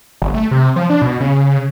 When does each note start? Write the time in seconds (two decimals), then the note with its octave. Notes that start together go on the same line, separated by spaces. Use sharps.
0.22 G1
0.34 A3
0.51 C3
0.76 F3
0.90 D4
1.02 B2
1.20 C#3